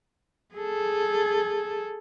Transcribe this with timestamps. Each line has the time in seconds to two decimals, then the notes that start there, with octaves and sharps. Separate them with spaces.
0.55 G#4 A4